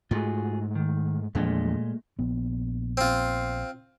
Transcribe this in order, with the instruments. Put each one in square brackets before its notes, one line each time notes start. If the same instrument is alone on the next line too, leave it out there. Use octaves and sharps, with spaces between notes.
[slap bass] G#2 A3 [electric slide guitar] F4 F#4 G#4
[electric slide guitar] D#3
[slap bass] E2 F3 D4 [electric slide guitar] A#2 G#3 A3
[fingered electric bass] A#1 B3
[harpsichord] C4 F4